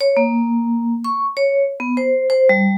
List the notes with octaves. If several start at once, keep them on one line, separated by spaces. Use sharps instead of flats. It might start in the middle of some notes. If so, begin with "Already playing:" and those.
C#5
A#3
C#6
C#5
B3
C5
C5
G3